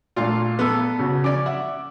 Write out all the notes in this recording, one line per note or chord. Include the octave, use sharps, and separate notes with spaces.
A#2 A3 D4 F4 F5
B3 A4
C#3 F#4
C#4 D5 D6
E5 F#5